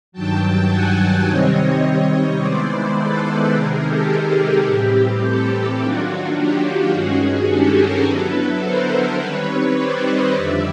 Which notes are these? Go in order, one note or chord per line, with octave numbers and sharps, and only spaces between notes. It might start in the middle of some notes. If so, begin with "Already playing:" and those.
G2 D#3 F#3 G5 A5
F#5 G#5
C3 D#3 G3 C4 C#5 D#5
D#3 G#3 B3 E4 C5 D5
A4 B4
C3 D#3 G#3 G#4 A#4
G4 A4
G4
A2 E3 G3 C4
G4 A4
D#3 F#3 A#3 D4 F4 F#4
G4
G2 D#3 G#3 C#4 F#4 G#4
F#4 G#4
G4 A4
G#4 A#4
D3 F#3 B3 E4 A4 B4
A#4 C5
D#3 G3 C4 B4 C#5
B4 C#5
C5 D5
C#5 D#5
F2 D3 G3 D5 E5